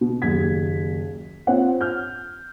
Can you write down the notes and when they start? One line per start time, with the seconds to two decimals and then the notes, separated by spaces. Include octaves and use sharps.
0.01 B2
0.22 F#1 D#2 G#6 B6
1.47 C4 F4 C5 C#5 F#5
1.81 F6 G6